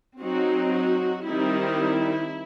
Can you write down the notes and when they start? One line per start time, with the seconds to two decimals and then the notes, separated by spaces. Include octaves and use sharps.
0.20 F#3 C4 D#4 F#4
0.73 F#4
1.27 D#3 G3 C4 D#4 E4